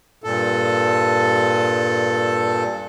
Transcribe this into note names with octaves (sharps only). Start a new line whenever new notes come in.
G2 A#2 A4